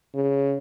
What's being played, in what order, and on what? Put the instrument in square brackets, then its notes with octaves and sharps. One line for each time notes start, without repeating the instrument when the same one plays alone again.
[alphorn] C#3